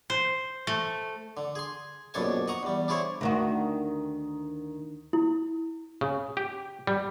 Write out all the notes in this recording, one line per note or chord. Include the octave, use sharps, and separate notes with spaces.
C5
A3
D3
G#4 C6
A#1 F#2 B2 D4 A4 G#5
D#5 F#5 A#5 C#6 D#6
E2 G3
D4 E4 G#4 C5 C#5
D2 D#3 F#4
E4
C#3
G4
G3